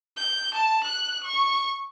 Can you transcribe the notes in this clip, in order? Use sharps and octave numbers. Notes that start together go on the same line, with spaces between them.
G6
A5
F#6
C#6